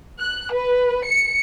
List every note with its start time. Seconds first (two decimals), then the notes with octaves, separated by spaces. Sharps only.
0.21 F#6
0.53 B4
1.06 C#7